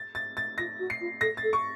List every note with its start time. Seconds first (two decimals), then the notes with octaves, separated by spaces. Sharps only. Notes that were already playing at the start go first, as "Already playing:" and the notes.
Already playing: A6
0.15 A6
0.37 A6
0.58 F4 A#6
0.79 F#4
0.90 C7
1.01 F4
1.21 A4 A#6
1.37 A6
1.43 A4
1.53 C#6